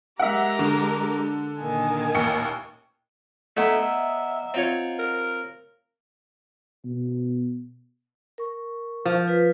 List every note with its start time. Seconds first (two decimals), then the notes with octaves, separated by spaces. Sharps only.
0.19 G#3 G4 A#4 E5 F#5
0.59 D3
1.60 A#2 D#3 G#5
2.14 A1 D#2 C#7
3.57 A3 B3 E4 D#5 F#5 A#5
3.83 E5
4.54 C4 F4 C#5
4.99 A#4
6.85 B2
8.38 A#4 C#6
9.05 F3
9.28 F4 B4